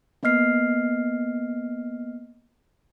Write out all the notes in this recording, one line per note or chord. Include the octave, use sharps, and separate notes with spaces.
A#3 B3 D#5 F6 C7